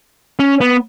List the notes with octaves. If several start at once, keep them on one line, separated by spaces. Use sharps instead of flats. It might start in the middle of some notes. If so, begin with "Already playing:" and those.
C#4
B3